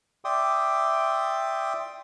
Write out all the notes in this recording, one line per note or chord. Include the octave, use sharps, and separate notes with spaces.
D5 E5 G5 C6 D6 D#6